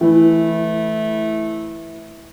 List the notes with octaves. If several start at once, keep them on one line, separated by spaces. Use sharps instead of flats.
E3 A3 E4